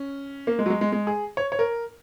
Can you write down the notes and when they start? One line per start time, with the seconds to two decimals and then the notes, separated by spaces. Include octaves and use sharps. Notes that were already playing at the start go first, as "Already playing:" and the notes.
Already playing: C#4
0.47 A#3
0.59 G#3
0.66 F#3
0.70 G#3
0.81 G#3
0.92 G#3
1.07 G#4
1.37 C#5
1.52 C#5
1.59 A#4